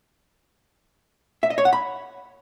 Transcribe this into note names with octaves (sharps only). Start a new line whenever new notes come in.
E5
D#5
C#5
F#5
B5